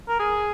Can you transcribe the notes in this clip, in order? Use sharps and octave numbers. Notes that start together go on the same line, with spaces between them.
A#4
G#4